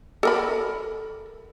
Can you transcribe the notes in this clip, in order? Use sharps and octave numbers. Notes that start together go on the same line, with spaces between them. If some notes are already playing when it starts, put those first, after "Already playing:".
A4 A#4 B5